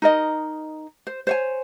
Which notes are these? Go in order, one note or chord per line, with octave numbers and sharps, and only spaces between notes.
D#4 A#4 D#5
C5
C5 C#5 G#5